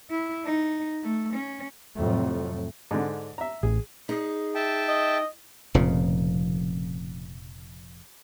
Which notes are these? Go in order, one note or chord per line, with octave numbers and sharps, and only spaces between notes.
E4
D#4
A3
C#4
F2 A2 C3 F#3 A3
G#2 D3
E5 A#5
A1 G#4
D#4 G#4
E5 G5 A5
D#5
F1 F2 A#2 C#3